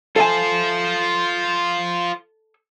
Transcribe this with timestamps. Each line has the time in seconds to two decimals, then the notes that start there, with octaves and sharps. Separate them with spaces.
0.16 F4 A4 C5 E5 G#5